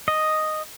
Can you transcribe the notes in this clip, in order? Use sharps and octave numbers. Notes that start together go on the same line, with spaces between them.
D#5